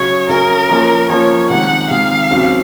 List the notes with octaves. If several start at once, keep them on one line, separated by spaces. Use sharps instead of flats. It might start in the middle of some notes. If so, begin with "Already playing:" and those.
Already playing: C#3 F#3 C#4 G#4 C#5
C#3 F#3 C#4 G#4 A#4
F3 A#3 C#4
F3 A#3 C#4 C#5
C3 D#3 G#3 F#5
C3 D#3 G#3 F5
D#2 C#3 F#3 C4